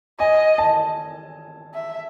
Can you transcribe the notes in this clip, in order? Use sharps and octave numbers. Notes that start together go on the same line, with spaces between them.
D#5 G#5
A5
E5